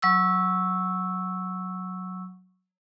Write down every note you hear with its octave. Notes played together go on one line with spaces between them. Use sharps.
F#3 C#6 E6